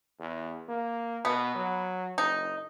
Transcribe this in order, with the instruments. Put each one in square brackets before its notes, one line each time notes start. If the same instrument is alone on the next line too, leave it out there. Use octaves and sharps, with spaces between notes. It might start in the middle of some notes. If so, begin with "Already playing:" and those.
[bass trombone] E2
A#3
[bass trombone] B2 [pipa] B3
[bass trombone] F#3
[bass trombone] F#1 [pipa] D#4